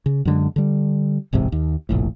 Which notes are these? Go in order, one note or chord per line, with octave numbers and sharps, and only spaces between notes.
C#3
F#2 D3 G#3
D3 G3
D1 A1 G#2 C3
D#2
F1 A#1 A2